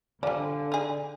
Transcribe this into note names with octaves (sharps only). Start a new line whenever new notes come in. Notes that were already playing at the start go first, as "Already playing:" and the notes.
D3 F3 G3 D5 F5 G#5
D#4 G#4